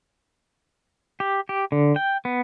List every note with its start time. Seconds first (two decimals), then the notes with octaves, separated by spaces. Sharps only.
1.20 G4
1.49 G4
1.72 D3
1.96 G5
2.25 B3